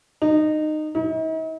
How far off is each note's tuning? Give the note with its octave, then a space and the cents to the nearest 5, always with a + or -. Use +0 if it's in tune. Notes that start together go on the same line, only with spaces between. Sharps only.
D#4 -20
D#4 +45